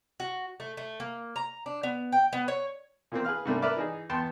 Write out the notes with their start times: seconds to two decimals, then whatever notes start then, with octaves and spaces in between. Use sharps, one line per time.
0.20 F#4
0.60 A3
0.77 A3
1.00 A#3
1.36 A#5
1.66 D4
1.83 B3
2.12 G5
2.33 B3
2.48 C#5
3.12 A#2 E3 A#3 C4
3.25 G#4 B4 F5 F6
3.45 G#2 C3 G3 A3 A#3 D4
3.62 A#4 B4 D5 E5 D6 F6
3.77 E3 D#4 G#4
4.09 E2 B3 G5 A5 C6